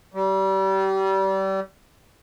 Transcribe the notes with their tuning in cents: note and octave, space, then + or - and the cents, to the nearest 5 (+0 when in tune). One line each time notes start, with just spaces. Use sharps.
G3 -30